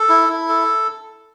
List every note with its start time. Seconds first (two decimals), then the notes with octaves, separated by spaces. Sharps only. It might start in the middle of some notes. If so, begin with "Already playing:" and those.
Already playing: A4
0.09 E4
0.28 E4
0.48 A4